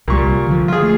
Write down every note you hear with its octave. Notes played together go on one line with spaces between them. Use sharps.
C2 A#2 G3 C#6
D3 F3
F4 G#4
A3